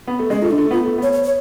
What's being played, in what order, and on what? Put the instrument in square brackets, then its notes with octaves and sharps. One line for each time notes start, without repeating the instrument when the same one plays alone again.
[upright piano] B3
A3
[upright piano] G#3 [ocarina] C#4
[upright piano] A3 [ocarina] F4
[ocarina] D4
[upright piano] A3
[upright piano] B3 [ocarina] F4
[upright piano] A3
[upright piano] B3 [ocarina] C#5
[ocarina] C#5
C#5